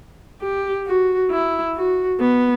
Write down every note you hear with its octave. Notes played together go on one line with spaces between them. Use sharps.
G4
F#4
E4
F#4
B3